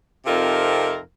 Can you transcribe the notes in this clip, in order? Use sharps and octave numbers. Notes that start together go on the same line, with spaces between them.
F2 C3 D#4 F4 A4 A#4